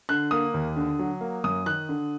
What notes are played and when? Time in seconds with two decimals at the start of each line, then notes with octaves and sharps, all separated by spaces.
0.09 D3 F#6
0.31 A#3 D#6
0.54 D#2
0.76 D3
0.99 F#3
1.21 A#3
1.44 F#2 D#6
1.66 D#3 F#6
1.89 D3